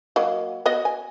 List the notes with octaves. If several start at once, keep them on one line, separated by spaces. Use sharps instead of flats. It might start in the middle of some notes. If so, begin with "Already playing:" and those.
F#3 A#3 D#5
B3 F#4 D#5
G#5